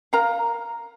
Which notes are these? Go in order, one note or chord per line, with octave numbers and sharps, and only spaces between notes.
A#4 F5 A#5